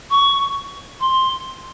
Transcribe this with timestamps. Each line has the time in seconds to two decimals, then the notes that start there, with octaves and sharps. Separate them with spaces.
0.10 C#6
1.00 C6